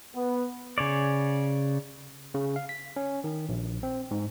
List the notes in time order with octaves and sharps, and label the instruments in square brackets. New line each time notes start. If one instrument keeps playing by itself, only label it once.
[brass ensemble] B3
[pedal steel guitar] C#3 C#5 D5
[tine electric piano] C#3
F5
B6
C#4
D#3
A#1
C4
G#2